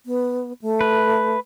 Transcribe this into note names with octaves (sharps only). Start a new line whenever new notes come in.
B3
A3
B4